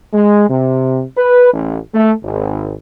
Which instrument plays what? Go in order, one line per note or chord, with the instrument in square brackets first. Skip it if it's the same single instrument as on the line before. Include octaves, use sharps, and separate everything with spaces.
[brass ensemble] G#3
C3
B4
A1
A3
G#1